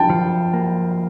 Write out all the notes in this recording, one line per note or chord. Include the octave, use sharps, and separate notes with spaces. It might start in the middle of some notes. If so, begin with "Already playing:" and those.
Already playing: G5 A5
F3
A#3